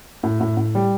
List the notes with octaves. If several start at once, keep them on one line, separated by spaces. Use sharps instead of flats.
A2
A2
A2
G3